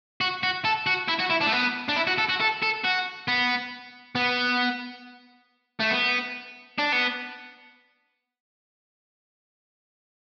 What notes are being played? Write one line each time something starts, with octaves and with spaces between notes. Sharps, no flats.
F#4
F#4
A4
F#4
E4
F#4
E4
D4
A3
B3
D4
E4
F#4
A4
F#4
A4
A4
F#4
B3
B3
A3
B3
D4
B3